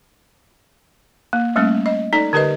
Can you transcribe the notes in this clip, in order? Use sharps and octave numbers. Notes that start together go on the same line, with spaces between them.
A#3
G3 A3 A#3 C#4
D#5
D#4 A4 D5
D3 G4 A#4 B4 D#5